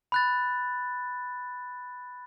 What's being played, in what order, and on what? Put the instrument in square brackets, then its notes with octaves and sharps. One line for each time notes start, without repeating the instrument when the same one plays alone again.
[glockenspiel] B5 F#6 A6